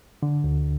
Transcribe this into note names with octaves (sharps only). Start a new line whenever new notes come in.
D3
D2